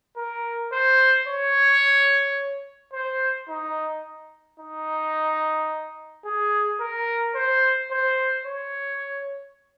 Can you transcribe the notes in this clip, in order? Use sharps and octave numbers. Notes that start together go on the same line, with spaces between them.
A#4
C5
C#5
C5
D#4
D#4
G#4
A#4
C5
C5
C#5